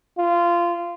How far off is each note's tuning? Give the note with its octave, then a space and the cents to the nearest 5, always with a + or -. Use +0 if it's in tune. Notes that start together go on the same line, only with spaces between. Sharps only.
F4 -15